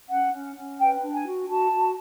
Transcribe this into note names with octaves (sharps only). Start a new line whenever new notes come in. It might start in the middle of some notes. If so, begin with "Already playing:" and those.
C#4 F#5
C#4
C#4
B4 G5
D4
G#5
F#4
F#4 A5
F#4